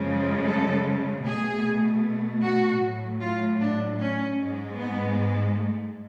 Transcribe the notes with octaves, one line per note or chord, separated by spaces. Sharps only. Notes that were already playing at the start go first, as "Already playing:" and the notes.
Already playing: F#2 C#3 F3 G#3
A4
B2 A3 G#4
F#4
A2 F#3 A3
F4
D4
C#4
G#2 G#3
B3
A3